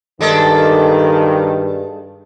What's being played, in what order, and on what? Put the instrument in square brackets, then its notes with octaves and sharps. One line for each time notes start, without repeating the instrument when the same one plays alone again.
[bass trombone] G2 [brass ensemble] D#3 [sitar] G#3 D4 A4